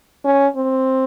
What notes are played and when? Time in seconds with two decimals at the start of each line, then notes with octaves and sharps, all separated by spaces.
0.25 C#4
0.56 C4